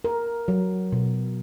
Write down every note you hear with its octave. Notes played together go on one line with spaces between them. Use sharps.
A#4
F#3
B2